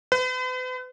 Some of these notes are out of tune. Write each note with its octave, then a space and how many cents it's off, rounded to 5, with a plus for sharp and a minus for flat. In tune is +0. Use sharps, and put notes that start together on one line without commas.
B4 +45